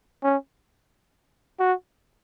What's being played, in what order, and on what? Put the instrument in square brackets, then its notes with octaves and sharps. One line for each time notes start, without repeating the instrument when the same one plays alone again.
[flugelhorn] C#4
F#4